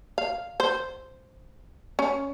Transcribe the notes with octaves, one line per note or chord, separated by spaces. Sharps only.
F5
C5
C#4